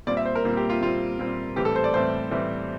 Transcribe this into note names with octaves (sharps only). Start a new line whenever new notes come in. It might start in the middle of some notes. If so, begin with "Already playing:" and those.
A#2 G3 C4 D5
E5
C5
A#4
A#2 G3 C4
G4
F4
A#2 G3 C4 F4
A#2 G3 C4
A2 E3 G3 C4 G4
A4
C5
D5
A2 E3 G3 C4 C5
A2 E3 G3 C4